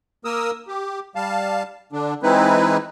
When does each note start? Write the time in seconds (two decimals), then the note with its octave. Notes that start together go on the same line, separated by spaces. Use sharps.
0.25 A#3 A#4 D#6 E6
0.68 G4
1.16 G3 F5 A5
1.92 D3 D4
2.23 E3 G#3 C4 D#4 E4 B4